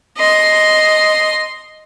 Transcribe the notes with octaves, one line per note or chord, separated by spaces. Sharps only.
D#5 C6